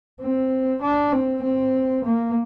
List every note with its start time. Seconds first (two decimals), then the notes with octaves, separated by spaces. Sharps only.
0.21 C4
0.82 D4
1.13 C4
1.43 C4
2.05 A#3